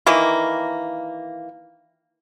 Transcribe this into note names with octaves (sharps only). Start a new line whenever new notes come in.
D#3 E3 A#3